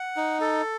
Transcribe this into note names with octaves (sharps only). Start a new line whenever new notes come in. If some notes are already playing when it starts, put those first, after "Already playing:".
Already playing: F#5
D#4
A4